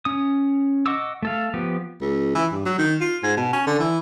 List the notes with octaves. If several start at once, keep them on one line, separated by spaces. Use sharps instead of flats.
C#4 D#6
D#5 F#5 C#6 D6 E6
A3 A4 F5
F3 B3 G4
C#2
E3
G2
F#3
D#3
F4
G#2
B2
C#4
D3
E3